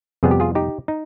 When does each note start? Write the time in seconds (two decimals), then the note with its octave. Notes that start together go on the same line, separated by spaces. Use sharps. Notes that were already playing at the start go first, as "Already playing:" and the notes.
0.23 F2 C3 G3 B3 G#4
0.31 G4
0.40 F4 G#4
0.55 D#4 G4
0.88 D#4